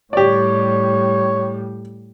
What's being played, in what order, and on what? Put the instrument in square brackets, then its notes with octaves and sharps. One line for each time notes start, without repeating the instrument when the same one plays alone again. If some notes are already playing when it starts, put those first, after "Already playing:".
[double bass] A2 G3 [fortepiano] G4 D5 [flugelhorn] C#5